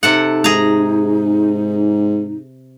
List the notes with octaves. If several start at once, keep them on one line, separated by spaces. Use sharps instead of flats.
C3 D#4 A4 F#5
G#2 G#4 A#5